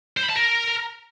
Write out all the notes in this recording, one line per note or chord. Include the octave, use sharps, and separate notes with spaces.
C5
B5
A5
A#4